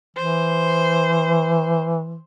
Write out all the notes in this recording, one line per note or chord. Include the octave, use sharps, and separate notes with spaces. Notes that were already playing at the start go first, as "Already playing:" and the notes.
E3 C5